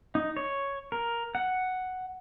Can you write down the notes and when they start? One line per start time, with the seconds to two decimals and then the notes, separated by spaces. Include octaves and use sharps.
0.15 D#4
0.37 C#5
0.92 A#4
1.35 F#5